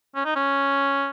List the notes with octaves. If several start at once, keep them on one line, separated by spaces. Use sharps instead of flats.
C#4
D#4
C#4